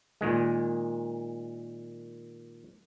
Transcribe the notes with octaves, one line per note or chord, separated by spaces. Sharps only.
A#2 D#3 G#3